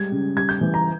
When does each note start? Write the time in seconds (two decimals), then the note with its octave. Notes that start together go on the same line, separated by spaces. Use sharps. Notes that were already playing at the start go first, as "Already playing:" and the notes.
Already playing: G3 G#3 G#6
0.12 C#3
0.36 G3 G#6
0.49 G6
0.61 E3
0.74 A#5